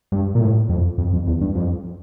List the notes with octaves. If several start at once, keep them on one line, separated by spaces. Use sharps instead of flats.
G2
A#2
A2
F2
F2
F2
E2
G2
F2